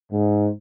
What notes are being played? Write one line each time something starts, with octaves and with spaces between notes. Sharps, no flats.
G#2